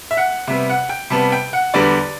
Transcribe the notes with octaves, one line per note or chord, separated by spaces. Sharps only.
E5
F#5
C3 G3 B3 E5
F#5
G5
C3 G3 B3 A5
G5
F#5
E2 D3 G3 B3 D5